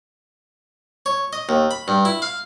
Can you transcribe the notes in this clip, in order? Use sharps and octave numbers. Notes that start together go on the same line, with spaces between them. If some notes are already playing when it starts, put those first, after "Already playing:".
C#5
D#5
D#2
B5
G2
E4
F5